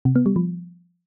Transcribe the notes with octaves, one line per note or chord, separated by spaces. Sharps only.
C3
B3
G3
F3